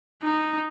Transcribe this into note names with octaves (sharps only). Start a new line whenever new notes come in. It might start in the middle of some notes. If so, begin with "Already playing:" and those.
D#4